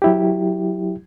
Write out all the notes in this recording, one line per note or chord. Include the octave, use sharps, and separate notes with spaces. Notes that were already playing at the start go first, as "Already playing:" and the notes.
F#3 E4 G4